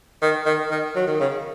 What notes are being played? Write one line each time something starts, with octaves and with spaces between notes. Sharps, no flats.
D#3
D#3
D#3
F#3
D#3
C#3